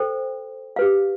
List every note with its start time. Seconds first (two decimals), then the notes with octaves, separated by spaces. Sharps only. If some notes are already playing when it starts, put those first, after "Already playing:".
Already playing: A4 C5 G5
0.76 G4 B4 F5